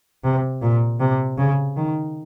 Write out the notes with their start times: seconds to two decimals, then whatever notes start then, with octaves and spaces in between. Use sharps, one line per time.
0.24 C3
0.62 A#2
1.00 C3
1.38 C#3
1.77 D#3